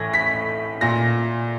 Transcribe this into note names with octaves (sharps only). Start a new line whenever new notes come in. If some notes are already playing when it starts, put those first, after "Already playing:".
Already playing: A2 E3 G#6 A#6
B6
A#2 A#6